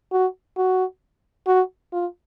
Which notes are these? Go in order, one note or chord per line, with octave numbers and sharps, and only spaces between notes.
F#4
F#4
F#4
F4